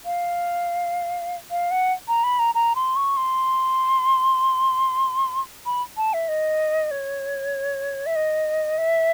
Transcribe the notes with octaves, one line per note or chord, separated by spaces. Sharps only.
F5
F5
F#5
A#5
B5
A#5
A#5
C6
C#6
C6
B5
A5
E5
D#5
C#5
E5
D#5
E5